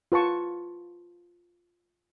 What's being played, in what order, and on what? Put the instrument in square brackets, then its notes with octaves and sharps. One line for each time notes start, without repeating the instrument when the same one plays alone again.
[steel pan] F4 B4 A5 C#6